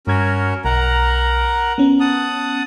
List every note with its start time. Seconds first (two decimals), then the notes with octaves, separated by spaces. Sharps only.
0.07 G2 C#4 F#4 A#4 G#6
0.65 B1 A#4 F#5 A#5
1.78 B3 C#4
2.00 F#5 A5 D#6